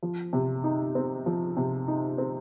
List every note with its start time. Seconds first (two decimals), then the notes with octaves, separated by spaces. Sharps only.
0.03 F3
0.33 C3
0.64 D#4
0.95 C4
1.26 F3
1.57 C3
1.88 D#4
2.18 C4